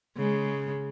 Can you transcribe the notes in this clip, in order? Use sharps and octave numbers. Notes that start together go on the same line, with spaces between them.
C#3 G#3